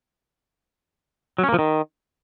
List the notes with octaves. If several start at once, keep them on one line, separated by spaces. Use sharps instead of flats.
F#3
C#4
A#3
F3
D#3